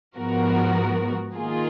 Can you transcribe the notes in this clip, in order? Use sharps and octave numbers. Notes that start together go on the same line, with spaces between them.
G#2 F3 B3 F#4 A#4
D#3 A#3 F4 G#4